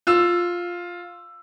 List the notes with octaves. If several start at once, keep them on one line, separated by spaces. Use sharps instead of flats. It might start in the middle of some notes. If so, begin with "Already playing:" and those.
F4 E6